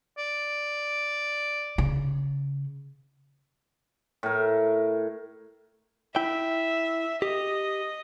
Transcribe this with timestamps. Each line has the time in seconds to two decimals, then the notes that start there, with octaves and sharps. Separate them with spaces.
0.18 D5
1.78 C#3
4.23 A2 A#4
6.16 E4 E5 G5
7.22 G4 D#5